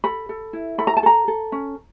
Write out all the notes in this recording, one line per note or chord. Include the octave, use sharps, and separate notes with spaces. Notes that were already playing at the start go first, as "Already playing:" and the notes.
A4 B5
A4
E4
A4 B5
A#5
A5
A4 A#5
A4
C#4